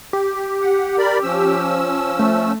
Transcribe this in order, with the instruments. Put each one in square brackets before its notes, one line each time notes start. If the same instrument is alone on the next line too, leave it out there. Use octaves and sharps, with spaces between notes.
[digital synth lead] G4
[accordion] F#5
A#4 D5 B5
F3 C#4 E6
[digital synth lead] A3